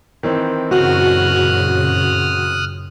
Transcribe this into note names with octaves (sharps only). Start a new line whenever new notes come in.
D#3 E3 C4
F#2 A#2 C#3 F#4 D#6 F6 F#6